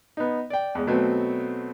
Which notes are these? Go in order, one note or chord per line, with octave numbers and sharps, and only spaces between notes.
B3 D#4
D5 G5
E2 G#3
B2 F#3 A3 B3 C4